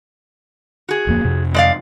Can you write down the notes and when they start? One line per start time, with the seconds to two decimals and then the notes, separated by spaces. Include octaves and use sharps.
0.89 F#4 G#4
1.07 D1 F2 A#3
1.24 F2 C3
1.54 G#3 D5 F5